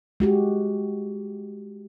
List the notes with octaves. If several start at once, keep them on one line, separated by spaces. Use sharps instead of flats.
G#3 F#4 G4